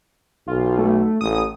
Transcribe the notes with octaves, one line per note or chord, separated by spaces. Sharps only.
B1 F4
A3
A1 D#6